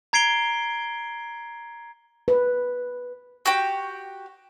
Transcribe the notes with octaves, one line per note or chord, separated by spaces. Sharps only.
A#5 G#6 C7 D7 G7
B4
F#4 G4 G5